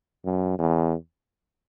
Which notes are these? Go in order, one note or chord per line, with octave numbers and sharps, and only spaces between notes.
F#2
E2